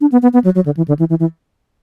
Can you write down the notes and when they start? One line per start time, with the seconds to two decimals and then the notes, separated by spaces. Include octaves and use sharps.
0.01 D4
0.12 B3
0.22 B3
0.33 B3
0.44 F#3
0.55 F#3
0.66 D3
0.77 E3
0.88 D3
0.99 E3
1.10 E3
1.20 E3